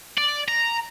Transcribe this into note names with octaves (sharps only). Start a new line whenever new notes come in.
D5
A#5